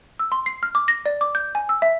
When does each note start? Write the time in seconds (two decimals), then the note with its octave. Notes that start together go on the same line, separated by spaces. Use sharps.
0.19 E6
0.32 C6
0.46 C7
0.63 F6
0.75 D6
0.88 A#6
1.06 D5
1.21 D6
1.35 G6
1.55 G#5
1.69 E6
1.82 E5